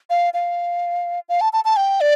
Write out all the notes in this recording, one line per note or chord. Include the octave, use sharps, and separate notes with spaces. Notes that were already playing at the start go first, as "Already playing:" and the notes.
F5
F5
F5
A5
A5
A5
G5
D5